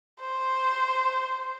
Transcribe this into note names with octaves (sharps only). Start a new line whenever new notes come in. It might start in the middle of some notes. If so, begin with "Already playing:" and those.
C5